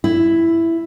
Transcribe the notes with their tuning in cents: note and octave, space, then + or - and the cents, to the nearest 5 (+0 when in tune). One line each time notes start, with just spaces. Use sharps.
E4 +5